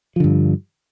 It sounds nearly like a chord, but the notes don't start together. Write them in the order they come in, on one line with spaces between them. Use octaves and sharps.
F3 D3 G2